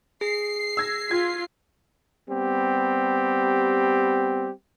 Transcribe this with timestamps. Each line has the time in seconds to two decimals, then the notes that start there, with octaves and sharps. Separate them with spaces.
0.21 G#4 C7
0.77 E6 G#6 A#6
1.11 F4 G#6 B6
2.29 G3 B3 C4 G4